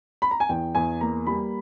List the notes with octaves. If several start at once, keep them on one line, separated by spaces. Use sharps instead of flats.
B5
A#5
G#5
E2 G5
E2 G#5
A#3 A#5
G3 B5